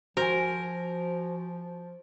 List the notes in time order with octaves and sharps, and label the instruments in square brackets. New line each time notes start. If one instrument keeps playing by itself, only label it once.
[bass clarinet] F3 [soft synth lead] F#4 [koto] A#4 [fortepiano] C5 G#5